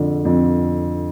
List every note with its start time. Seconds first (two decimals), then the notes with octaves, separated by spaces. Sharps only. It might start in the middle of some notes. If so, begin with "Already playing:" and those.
Already playing: F2 D3
0.25 F2